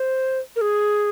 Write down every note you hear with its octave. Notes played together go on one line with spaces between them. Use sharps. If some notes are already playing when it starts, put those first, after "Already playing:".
Already playing: C5
A#4
G#4